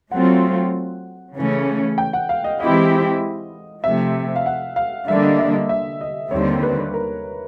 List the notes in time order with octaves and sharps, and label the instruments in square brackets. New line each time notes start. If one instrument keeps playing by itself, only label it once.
[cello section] F#3 A3 C4 F4 [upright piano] F#5
[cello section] C#3 E3 A3 C#4
[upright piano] G5
F#5
F5
D#5
[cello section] E3 G#3 C4 E4 G4 [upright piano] D#5
[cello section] C3 F3 A3 [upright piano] E5
[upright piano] F5
F#5
F5
[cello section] D3 G3 A#3 D4 [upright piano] E5
[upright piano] D#5
E5
D#5
E5
D#5
[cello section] D#2 D3 G3 C4 [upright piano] C#5
[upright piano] B4
A#4